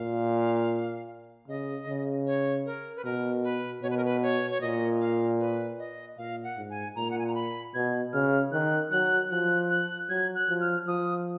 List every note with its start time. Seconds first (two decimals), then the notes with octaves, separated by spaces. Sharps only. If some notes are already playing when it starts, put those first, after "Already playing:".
Already playing: A#2 F5
1.48 C#3 D#5
1.87 C#3
2.26 C#5
2.66 A#4
2.96 B4
3.04 B2 A#4
3.43 B4
3.82 B2 C#5
3.90 B4
3.97 A#4
4.05 B4
4.22 C#5
4.51 C#5
4.61 A#2 D#5
5.00 F5
5.39 B4
5.78 D#5
6.18 A#2 F5
6.44 F#5
6.57 G#2
6.70 G#5
6.96 A#2 A#5
7.11 F#5
7.19 G#5
7.27 A#5
7.35 B5
7.74 B2 G#6
8.13 C#3 F6
8.52 D#3 F#6
8.91 F#3 F#6
9.31 F3 F#6
9.70 F#6
10.09 F#3 G#6
10.35 F#6
10.49 F3
10.61 F6
10.87 F3 D#6